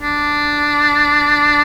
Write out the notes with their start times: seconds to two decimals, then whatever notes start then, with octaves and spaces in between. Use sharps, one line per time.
0.01 D4